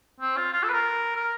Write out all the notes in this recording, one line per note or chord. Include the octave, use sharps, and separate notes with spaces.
C4
F4
F4
A4
B4
A#4
A#4